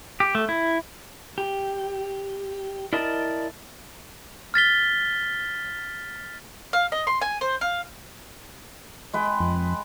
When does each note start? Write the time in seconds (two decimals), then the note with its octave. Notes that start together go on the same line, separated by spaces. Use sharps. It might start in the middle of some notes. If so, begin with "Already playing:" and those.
0.20 G4
0.35 A3
0.49 E4
1.38 G4
2.93 E4 A#4 D5 D#5 A5
4.54 F6 A6 B6 G7
6.73 F5
6.92 D#5
7.07 C6
7.21 G#5
7.41 C5
7.61 F5
9.13 G#3 B4 G5
9.40 F2